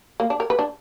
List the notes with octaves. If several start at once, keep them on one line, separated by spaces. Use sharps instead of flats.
A#3
D4
A#4
B4
D4